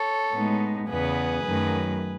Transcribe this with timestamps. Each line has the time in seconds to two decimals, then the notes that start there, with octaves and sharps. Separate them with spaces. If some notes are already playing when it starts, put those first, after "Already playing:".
Already playing: A4 C#5
0.34 A2 G#3 B3 D#4
0.90 E2 C#3 E3 B3 G#4 B4
1.46 F#2 D#3 F#3 A3